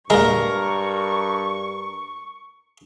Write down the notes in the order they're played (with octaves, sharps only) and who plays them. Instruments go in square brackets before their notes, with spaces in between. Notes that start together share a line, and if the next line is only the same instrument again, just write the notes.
[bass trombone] G2 [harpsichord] A#2 G#3 [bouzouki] A#4 [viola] C#6